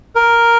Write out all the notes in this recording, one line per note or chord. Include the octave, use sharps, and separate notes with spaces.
A#4